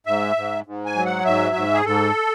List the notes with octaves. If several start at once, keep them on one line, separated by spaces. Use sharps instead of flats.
G#2 E5
G#2
G#2
G#5
F#3
F#5
G#2 E5
G#2
G#4
G#2 A4